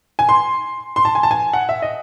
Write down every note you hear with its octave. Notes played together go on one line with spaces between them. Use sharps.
G#5
C6
C6
A5
G#5
A5
G#5
F#5
E5
D#5